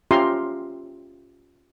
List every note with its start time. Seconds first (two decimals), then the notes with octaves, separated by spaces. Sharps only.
0.11 C#4 F4 G4 E5 A#5 C6